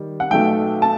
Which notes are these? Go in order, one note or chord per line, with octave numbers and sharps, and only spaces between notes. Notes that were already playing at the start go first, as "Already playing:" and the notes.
Already playing: D#3 G3
F#5
B1 B2 A3 G5
A5